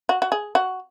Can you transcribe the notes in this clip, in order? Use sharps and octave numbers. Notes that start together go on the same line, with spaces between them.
F#4
F#4
G#4
F#4